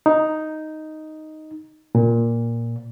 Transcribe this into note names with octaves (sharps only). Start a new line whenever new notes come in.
D#4
A#2